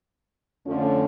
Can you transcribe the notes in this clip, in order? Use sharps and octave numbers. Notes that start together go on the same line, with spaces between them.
F2 D3 F3 A3 C#4